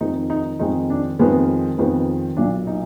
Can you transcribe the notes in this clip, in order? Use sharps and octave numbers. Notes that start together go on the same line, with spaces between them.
F2 D#3 G#3 D#4
D#4
F2 D#3 G#3 D#4
D4
F2 D#3 G#3 B3
F2 D#3 G#3 B3
B1 A#2 F#3 D4
D#4